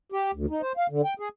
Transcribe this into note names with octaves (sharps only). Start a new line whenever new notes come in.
G4
D2
D#4
C5
F5
D3
G5
G#4